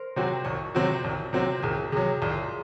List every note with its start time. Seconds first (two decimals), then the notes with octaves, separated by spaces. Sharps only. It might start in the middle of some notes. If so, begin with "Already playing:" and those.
Already playing: A#4 C5
0.16 C3 F#3 C4 F#4
0.44 C2 C#5
0.75 C3 F#3 C4 F#4
1.04 C2
1.33 C3 F#3 C4 F#4
1.59 C2 G#4 A#4
1.92 C3 F#3 G#4
2.22 C2 F4